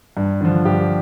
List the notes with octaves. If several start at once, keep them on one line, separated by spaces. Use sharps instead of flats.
G2
D3 F3
G2 G4